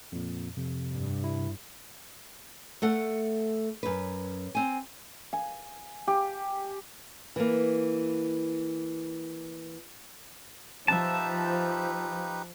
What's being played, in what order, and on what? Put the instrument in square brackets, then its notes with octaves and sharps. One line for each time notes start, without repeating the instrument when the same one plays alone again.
[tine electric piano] F2 A#2
[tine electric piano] F2 [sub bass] C3
[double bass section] G2
[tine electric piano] E4
[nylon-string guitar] A3 A4 F#5
F#2 B4
C4 G#5
[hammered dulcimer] G#5
G4
[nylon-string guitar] E3 A#3
[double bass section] F3 [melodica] D#4 G4 B4 [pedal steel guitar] E5 A5